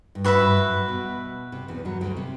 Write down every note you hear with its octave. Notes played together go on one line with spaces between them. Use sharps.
G2
A2 F#4 B4 E5 B5
G2
F#2
G2
B2
C3
E2 E3
F#2 F#3
D2 D3
C3